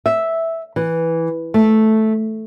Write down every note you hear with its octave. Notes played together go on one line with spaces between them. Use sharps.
E5
E3
A3